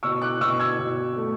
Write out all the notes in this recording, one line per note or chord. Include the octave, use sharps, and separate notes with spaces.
B2 C#6 E6
D6 F#6
B2 C#6 E6
E6 G#6
B2
A3